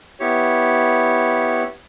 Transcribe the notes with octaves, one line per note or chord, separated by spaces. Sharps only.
B3 E4 G4 C#5